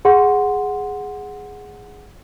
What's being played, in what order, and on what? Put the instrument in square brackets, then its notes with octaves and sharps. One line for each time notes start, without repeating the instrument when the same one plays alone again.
[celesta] G#4 F#5 C6